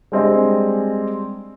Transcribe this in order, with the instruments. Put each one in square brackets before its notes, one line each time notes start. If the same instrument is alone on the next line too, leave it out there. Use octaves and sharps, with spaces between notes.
[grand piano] G3 G#3 C4 D4 D#5 G#5